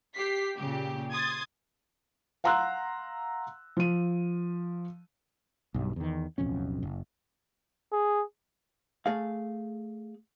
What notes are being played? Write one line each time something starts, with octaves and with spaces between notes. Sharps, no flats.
G4 B6 C7
A#2 C#3 G4
C6 D#6 G#6 A6
F5 F#5 A#5 C6 E6 F#6
F3 D#7
B1 G2
E2 D#3
D1 B1 F2 C#4
F#1
G#4
A3 G#4 F5